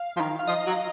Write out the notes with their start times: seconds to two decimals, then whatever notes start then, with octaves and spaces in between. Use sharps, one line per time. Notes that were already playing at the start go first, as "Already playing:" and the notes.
Already playing: F5
0.17 F3
0.20 D#3
0.39 F5
0.47 F3 D#5
0.67 F#3